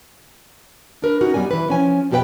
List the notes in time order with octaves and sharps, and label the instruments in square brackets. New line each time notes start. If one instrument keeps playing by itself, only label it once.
[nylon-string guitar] D4 A#4 B4
C#4 D#4 F#4 A#4
F#2 G3 B3 D5 G#5
E3 B4
F3 C#4 G#5
F2 B2 G4 A4 B4 G5